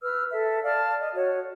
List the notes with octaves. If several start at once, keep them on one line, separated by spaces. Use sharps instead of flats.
B4 E6 F6
A4 E5
D5 F5 A5 F6
D#5
F#4 C#5